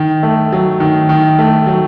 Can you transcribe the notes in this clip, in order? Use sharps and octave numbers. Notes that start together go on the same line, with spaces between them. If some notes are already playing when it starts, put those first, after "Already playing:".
Already playing: D#3
A3
F#3
D#3
D#3
A3
F#3